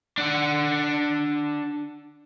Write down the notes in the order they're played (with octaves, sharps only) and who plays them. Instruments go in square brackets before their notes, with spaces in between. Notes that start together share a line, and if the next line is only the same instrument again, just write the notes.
[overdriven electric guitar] D4 F#5